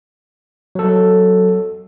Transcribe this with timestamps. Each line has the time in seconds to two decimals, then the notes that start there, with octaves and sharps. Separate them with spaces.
0.75 F#3 A4